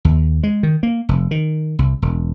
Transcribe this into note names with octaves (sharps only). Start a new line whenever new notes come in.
D#2
G#3
D#3
A#3
F1
D#3
C2
E1